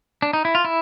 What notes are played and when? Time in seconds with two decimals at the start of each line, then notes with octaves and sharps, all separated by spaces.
0.22 D4
0.33 D#4
0.45 E4
0.55 F4
0.65 E4